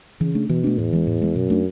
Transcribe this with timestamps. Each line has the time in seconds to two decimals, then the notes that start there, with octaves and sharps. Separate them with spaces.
0.20 C#3 E3
0.35 A3 D4
0.49 B2 E3
0.64 A3 D4
0.78 E2 A2
0.93 E3 G#3
1.07 A2
1.22 E3 G#3
1.36 F#2 B2
1.50 A3 D4